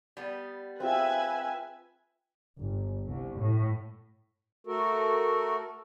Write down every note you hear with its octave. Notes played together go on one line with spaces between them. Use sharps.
G3 B3
C4 F4 G#4 B4 E5 G#5
G1
C2
A2
A3 F#4 A4 A#4